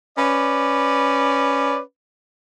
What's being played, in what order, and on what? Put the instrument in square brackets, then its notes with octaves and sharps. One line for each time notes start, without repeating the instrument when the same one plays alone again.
[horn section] C#4 B4 D5